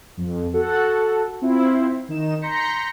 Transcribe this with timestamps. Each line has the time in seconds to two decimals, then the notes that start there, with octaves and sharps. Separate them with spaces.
0.17 F2
0.53 F#4 A4 F#5
1.42 C4 E4 F4 C5
2.08 D#3 D#4 E7
2.42 A#5 C6 G6 A#6 B6 C#7